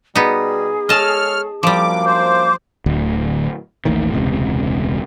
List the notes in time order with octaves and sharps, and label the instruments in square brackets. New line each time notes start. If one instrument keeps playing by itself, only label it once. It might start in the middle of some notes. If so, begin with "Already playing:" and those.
[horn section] B2 G3 [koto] B3 D#4 [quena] G#4
[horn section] G#3 A4 C#5 [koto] D#5 A5 [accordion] F6
[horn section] F#2 A#3 D4 [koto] F3 G3 [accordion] D6
[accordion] C5 [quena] D6
[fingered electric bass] D1 D2
A1 D#2 A2 D#3
E1 C#2 C3